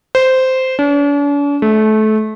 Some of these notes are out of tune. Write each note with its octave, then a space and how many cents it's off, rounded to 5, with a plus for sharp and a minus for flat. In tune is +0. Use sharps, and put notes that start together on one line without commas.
C5 -10
D4 -45
A3 -25